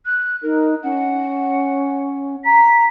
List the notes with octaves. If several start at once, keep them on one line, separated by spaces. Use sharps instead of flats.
F#6
D#4 A#4
C#4 F#5
A#5 B6